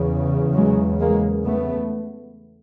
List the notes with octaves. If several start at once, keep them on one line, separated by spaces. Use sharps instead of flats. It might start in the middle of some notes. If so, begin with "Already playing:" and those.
Already playing: E2 C#3
F#3 G#3
G#3 A#3
A3 B3